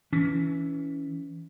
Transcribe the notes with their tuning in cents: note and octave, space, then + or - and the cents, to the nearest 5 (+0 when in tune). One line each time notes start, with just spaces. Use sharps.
E3 +0 C#4 +25